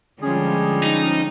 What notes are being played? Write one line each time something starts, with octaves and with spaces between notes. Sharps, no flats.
D3 F3 G3 G#3 C#4 G#4
D#4